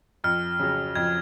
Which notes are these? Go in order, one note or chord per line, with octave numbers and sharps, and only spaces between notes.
F2 F6
C#3 F#3
F2 G#6